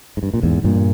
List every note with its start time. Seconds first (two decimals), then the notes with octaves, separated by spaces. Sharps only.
0.17 G#2
0.23 G2
0.34 A#2
0.43 E2 G#2
0.64 G2 A#2